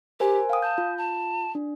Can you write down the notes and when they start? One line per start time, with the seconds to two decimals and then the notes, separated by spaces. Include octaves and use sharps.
0.20 G4 A#4 C5 G#5
0.50 F5 G5 D#6
0.62 A5 G6
0.78 F4
0.97 A5
1.55 D4